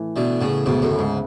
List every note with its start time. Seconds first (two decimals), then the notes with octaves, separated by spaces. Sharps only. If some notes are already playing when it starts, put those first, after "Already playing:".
Already playing: A2 E3 A3
0.16 B2 D3 E4
0.41 A2 C#3 B3
0.66 D2 G#2 B2
0.82 F#2 A2
0.91 C#3
0.99 G#2